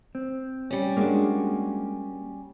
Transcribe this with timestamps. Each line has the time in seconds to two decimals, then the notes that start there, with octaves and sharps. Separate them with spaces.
0.15 C4
0.70 G3 C#4
0.97 G#3 A#3 D4 F#4